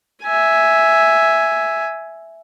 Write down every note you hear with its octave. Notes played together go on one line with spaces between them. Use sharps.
E5 G#5